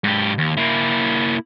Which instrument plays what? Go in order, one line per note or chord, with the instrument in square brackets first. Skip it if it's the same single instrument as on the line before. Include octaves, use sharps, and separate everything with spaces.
[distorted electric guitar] G#2 G4
D#2
A#3 E4